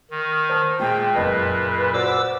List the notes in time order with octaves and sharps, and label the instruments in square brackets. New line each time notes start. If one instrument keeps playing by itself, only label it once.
[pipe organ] D#3
[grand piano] C5 A5
[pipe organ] A#2 [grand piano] G#3 [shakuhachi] G5
[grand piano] F#1 D#5 A5 [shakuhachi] B4
[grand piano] F#4 C5 D5 [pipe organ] D6 E6